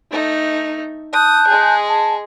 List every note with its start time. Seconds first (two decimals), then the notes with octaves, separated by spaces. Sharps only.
0.11 A3 D#4
1.13 A5 D#6 F#6 G6
1.47 G#3 G#4
1.89 A5